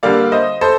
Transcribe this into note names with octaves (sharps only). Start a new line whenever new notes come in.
D3 G3 A#3 D5 F5
C5 D#5
A4 C5